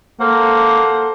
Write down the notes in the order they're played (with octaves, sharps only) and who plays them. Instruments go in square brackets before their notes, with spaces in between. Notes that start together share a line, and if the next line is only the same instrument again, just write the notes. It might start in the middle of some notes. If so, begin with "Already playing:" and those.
[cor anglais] A#3 [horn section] A4 C5 F#5